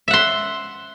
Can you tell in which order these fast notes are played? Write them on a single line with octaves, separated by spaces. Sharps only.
E5 F#5 C6